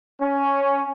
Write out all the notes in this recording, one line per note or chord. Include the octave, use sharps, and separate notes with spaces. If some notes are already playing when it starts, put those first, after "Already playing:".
C#4